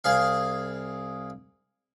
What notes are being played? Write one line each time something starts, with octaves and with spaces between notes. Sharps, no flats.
C2 G#4 F5